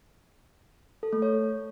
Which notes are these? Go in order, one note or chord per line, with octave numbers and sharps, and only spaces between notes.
A4
A3
C#5